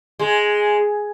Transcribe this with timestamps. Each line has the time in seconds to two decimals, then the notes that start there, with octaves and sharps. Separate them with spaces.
0.19 G#3